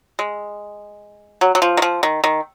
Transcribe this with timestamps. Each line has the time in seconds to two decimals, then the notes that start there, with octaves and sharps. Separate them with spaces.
0.19 G#3
1.41 F#3
1.55 F#3
1.62 F3
1.77 D#3
1.82 F3
2.03 D#3
2.24 D#3